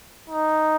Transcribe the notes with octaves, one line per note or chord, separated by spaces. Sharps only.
D#4